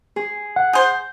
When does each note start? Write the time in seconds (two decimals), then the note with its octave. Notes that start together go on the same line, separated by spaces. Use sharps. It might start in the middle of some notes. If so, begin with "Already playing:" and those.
0.16 G#4
0.56 F#5
0.73 G#4 C5 G6